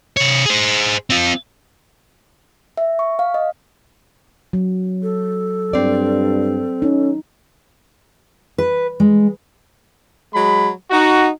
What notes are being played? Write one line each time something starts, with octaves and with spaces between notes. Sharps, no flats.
C3 C#5
G#4 C5
C4 F4
E5
C#6
F5
D#5
F#3
A4
G2 C4 D5
C#4 D#4
B4
G#3
F#3 G#3 B5
D#4 F#4